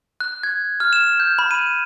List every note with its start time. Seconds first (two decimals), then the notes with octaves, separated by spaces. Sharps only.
0.20 F#6
0.43 G#6
0.80 F6
0.93 E7
1.20 G6
1.39 B5
1.51 D#7